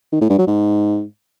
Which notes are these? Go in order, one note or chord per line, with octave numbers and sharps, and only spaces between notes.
D#3
A2
G2
F#3
G#2